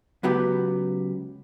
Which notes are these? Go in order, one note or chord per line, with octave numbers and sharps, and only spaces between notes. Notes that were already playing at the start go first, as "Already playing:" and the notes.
C#2 F#3 B3 G4